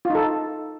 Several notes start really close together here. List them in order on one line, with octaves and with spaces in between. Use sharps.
F4 D#4 A4